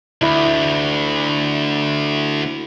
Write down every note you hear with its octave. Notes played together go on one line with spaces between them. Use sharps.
D2 E4